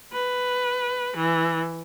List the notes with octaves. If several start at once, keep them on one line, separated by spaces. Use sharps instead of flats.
B4
E3